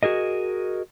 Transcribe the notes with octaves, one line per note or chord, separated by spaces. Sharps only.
F#4 G#4 A#4 D#5